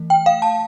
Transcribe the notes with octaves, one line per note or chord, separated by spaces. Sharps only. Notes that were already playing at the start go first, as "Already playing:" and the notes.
Already playing: E3 A3
G5
F5
A5